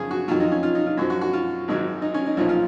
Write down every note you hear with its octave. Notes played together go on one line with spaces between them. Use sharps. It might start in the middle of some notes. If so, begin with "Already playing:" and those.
Already playing: F#2 C#3 F3 G#4
F#4
F2 D#3 F#3 F4
D#4
C#4
F4
D#4
F4
F#2 F3 F#4
F#4
F#4
F4
G#1 G#2 D#3 F#3
D#4
C#4
D#4
B1 A#2 F3 D#4
F4